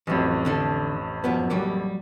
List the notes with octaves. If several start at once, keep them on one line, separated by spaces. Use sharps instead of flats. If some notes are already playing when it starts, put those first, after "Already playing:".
A1 F2 E3 F#3
D3 D4 A4
F#2 F3 B3
F#3 G3 A#3